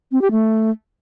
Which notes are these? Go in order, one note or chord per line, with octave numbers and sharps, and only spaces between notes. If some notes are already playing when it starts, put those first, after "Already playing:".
C4
G4
A3